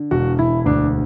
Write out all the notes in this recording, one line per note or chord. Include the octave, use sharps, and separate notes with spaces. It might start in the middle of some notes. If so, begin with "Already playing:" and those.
Already playing: D3
E1 F#4
E1 E4
D2 D4